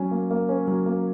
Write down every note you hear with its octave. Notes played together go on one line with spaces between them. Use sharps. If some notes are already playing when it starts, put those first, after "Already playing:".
Already playing: F#3 C#4
A#3
A#3
C#4
F#3
A#3